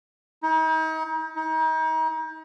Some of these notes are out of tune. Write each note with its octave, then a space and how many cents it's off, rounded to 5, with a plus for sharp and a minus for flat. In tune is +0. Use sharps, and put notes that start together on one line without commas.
D#4 +40
D#4 +35